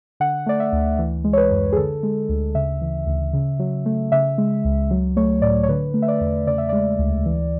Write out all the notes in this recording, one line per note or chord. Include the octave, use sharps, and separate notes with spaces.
D3 F#5
A3 D5
E5
D2
E3
G#3
C#5
B4
F#2
G#4
D3 A4
G#3
D2
C#3 E5
E3
D2
C#3
F#3
A3
C#3 E5
G#3
C#2
F#3
A3 C#5
A2 D5
C#5
D3 B4
A3
E5
D5
E2
C#3 D5
E5
G#3 D5
D2
E3